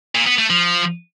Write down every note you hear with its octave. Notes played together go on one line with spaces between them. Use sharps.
A#2
B3
A3
F3